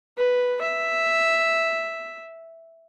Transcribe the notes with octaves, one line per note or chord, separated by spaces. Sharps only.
B4
E5